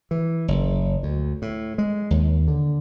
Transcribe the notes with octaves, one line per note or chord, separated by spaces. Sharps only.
E3
F#1
D2
A2
G#3
D#2
D3